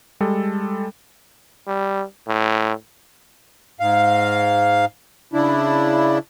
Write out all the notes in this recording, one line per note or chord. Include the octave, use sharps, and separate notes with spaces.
G3 G#3 A4
G3
A2
G#2 F5
C#3 D4 E4